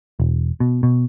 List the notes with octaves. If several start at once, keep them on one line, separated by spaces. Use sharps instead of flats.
E1
B2
B2